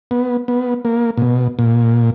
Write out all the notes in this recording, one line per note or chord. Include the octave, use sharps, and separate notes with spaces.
B3
B3
A#3
A#2
B2
A#2